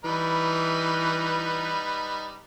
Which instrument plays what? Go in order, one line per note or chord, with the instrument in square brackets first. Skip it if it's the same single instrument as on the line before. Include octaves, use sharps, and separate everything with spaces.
[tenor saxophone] E3 [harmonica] G3 D#4 B4